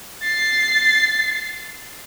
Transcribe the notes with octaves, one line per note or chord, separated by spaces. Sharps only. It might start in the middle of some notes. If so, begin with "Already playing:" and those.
A6 C7